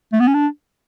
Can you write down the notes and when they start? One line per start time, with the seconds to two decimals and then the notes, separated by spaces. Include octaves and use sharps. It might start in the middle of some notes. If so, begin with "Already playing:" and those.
0.13 A3
0.20 B3
0.28 C#4
0.34 D4